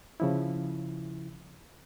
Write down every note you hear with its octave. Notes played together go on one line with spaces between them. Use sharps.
C#3 F3 E4